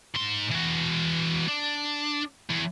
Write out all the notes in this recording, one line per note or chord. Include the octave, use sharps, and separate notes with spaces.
G#2 C6
E3 F#4
D4
E2